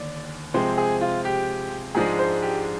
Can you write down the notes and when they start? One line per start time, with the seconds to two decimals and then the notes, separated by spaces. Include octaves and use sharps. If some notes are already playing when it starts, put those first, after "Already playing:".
Already playing: D#2 D3 D5
0.54 C3 F3 G#3 C4 C5
0.78 G#4
1.01 F4
1.25 G4
1.95 G#2 F3 G#3 D4 G#4
2.19 C5
2.42 G4